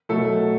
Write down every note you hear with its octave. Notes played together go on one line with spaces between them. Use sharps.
B2 F#3 A3 A4